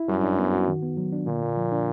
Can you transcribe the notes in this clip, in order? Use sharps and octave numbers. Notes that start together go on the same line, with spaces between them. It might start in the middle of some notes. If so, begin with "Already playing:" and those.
Already playing: E4
F#2 G3
D4
B3
F#4
D#3
B3
F#3
D4
A#2 D3
A#3
F3
D4